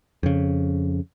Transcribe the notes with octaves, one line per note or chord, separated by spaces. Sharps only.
F2 C#3